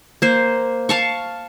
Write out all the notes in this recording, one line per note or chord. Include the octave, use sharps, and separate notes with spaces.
A#3 C5
F5 A5 C#6